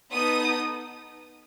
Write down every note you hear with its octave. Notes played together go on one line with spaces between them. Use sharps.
B3 D#4 A4 D#6